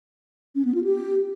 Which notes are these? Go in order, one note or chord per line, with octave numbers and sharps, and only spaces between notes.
C#4
B3
F4
G4